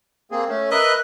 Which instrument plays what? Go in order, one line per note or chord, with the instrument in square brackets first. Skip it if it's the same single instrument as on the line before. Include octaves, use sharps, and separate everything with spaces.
[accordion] A#3 C4 G#4
A3 C#4
[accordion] A#4 B4 F#6 [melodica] D#5 E5